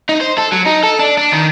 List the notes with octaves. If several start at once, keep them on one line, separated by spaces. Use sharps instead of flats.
D#4
C5
A4
F#3
D#4
A4
D4
D4
D#3